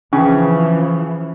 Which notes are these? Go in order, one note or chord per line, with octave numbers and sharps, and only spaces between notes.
C#3 E3 F3 C#4